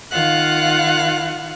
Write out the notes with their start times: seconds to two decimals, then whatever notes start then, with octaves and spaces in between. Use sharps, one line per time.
0.12 D#3 F4 F5 F#5 F#6